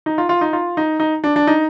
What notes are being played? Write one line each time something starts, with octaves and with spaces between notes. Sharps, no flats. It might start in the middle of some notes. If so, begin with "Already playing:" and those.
D#4
F4
F4
D#4
F4
D#4
D#4
D4
D4
D#4